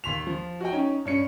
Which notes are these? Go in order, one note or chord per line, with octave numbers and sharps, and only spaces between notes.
D#2 C6 B6 F7
F3
F#4 D#5 G5
C#4 D#4
G2 C#4 C#7